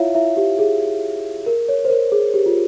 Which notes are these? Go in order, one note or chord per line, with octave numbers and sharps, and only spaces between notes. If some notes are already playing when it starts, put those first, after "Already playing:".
Already playing: E4 F4 C#5 E5 F5
E4 E5
G4
G#4
A#4
C#5
C5
A#4
G#4
G4
F4